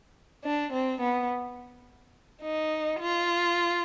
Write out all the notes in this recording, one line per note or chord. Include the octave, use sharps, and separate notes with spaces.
D4
C4
B3
D#4
F4